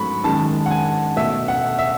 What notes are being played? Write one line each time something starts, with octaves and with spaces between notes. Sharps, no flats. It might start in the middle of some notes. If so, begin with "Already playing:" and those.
Already playing: G#2 F#3 A3 B5 C#6
F#2 D#3 G#3 A5
F#5
G#5
B2 A3 E5
F#5
E5